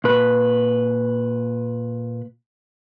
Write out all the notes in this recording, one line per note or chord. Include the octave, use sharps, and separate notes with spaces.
A#2 B4